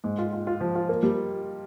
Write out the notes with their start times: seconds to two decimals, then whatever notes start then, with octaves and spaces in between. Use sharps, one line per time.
0.04 G#2
0.18 F4
0.33 F4
0.47 F4
0.61 F3
0.75 F4
0.89 A#3
1.03 G3